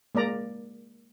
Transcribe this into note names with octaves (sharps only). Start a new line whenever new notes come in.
G#3 A#3 D5 A#5